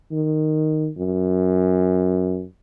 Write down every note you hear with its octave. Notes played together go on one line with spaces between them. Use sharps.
D#3
F#2